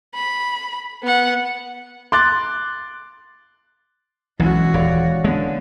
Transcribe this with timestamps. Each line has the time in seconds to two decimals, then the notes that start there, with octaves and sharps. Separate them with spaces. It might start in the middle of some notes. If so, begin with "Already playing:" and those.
0.15 B5
1.03 B3 F#5
2.12 C6 D6 F#6 A6
4.40 B1 E3 G#3 B3 C#4 E4 F#4
4.74 D#1 C#5 D5 F5
5.24 D3 G#3 B3